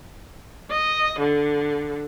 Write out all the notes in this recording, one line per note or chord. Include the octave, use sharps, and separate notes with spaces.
D#5
D3